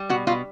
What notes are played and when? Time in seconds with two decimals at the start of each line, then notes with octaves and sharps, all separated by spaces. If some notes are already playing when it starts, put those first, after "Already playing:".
Already playing: G3
0.09 B2 F#4
0.27 B2 F4